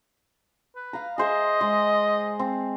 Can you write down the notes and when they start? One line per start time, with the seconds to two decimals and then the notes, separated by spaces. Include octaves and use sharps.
0.76 B4
0.93 F5 A#5
1.18 G#4 C5 D#5 E5
1.61 G#3
2.39 C4